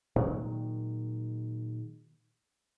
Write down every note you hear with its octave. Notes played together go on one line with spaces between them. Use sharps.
A#2 D#3 F#3 G#3